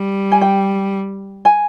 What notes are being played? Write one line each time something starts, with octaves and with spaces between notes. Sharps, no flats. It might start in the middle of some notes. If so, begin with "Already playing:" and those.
Already playing: G3
G#5
G5
G#5